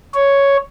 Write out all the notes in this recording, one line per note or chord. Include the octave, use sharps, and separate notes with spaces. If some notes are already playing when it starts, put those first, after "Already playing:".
C#5